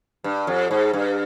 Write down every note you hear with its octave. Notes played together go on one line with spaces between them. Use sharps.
G2
F2
G#2
G2